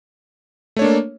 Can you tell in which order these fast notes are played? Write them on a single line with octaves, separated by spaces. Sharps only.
A3 C#5 D4 A#3